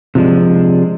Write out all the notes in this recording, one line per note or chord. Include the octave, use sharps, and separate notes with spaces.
C3 F3 G#3 D4